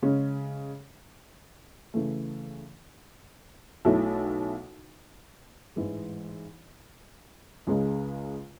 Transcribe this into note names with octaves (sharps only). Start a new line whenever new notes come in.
C#3 G#3 C#4
C#3 E3 A3
B1 B2 A3 E4 A4
A1 G#2 E3 G#3
C#2 C#3 G#3